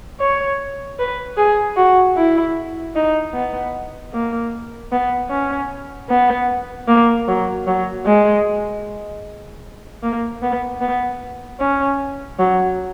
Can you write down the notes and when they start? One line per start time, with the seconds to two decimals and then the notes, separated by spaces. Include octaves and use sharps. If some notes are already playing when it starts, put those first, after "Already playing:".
0.20 C#5
0.99 B4
1.37 G#4
1.77 F#4
2.17 E4
2.95 D#4
3.34 B3
4.13 A#3
4.92 B3
5.30 C#4
6.09 B3
6.88 A#3
7.28 F#3
7.67 F#3
8.06 G#3
10.03 A#3
10.42 B3
10.81 B3
11.60 C#4
12.39 F#3